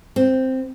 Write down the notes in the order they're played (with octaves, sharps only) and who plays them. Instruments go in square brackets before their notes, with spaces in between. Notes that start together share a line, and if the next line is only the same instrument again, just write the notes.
[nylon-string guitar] C4